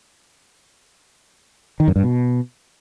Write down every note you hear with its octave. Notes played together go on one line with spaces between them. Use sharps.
D#3
F#2
G2
B2